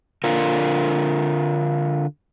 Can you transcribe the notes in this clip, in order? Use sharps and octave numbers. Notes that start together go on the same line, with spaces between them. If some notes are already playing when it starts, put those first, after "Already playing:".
D3 F4 A#4